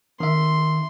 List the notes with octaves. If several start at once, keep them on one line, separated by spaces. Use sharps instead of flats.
D#3 E5 C6